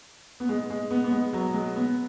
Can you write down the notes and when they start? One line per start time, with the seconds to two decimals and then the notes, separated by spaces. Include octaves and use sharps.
0.40 B3
0.49 G#3
0.70 G#3
0.91 B3
1.04 B3
1.12 G#3
1.33 F#3
1.54 G#3
1.76 B3